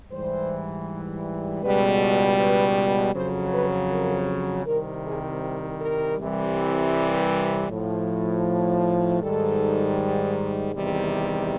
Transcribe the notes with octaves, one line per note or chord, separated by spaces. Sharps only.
G#2 E3 G3 C5
C#2 B2 G3 B4
B4
F2 C#3 F#3 C5
B4
A#4
C2 C3 D#3 G3 A#4
G#4
A#4
C2 C3 E3 G3
B4
A2 F3
G#2 D#3 G3 A4
E2 C3 D#3 G3